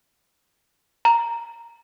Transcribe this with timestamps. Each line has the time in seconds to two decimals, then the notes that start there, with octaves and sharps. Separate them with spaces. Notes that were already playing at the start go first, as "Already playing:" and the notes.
1.05 A#5